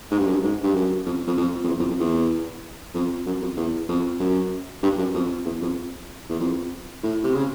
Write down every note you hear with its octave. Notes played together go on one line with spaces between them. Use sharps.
G#2
G2
F#2
G2
G#2
G2
F#2
F2
F2
F2
F2
E2
F2
F2
E2
F2
F#2
F2
E2
F2
F#2
G2
F#2
F2
E2
F2
E2
F2
A2
C3
C#3